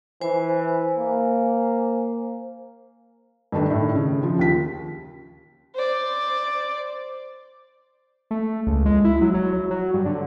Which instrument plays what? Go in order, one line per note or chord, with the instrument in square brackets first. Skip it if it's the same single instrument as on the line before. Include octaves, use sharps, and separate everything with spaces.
[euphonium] E3 [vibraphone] C5 G#5
[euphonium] A#3
[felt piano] G2 D#3 A3 D4
A2 D#3
C#3
F3
D#2 B6
[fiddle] C5 D5
[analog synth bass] A3
C#2
G#3
E4
F#3
F#3
F#3
F#3
G2
D3